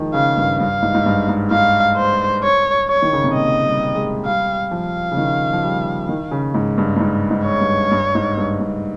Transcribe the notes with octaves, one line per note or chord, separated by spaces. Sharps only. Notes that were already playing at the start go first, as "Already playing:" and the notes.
Already playing: D#3 F3 G#3
C#3 F5
G2
G2 F5
G#2
G#2
G2
G#2
G#2 F5
C5
C#5
C#5
D#3
C#3
C3
A#2 D#5
G3
G#3
G3 F5
F3 F5
C#3
D#3
F3
G3
D#3
C#3
G#2
G2
G2
G#2
G#2
C#5
G2
G2
G#2
G2
G2